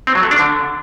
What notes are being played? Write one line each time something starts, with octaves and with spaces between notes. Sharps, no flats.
C4
F#3
A3
D4
D3